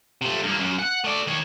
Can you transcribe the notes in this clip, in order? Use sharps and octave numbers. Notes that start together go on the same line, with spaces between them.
C3 A3
G2 A#3
F#2
F#5
A3 D5
D#3 C#5